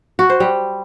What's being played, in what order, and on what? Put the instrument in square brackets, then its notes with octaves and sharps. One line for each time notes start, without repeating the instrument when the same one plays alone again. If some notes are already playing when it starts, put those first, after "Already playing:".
[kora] F#4
C5
G3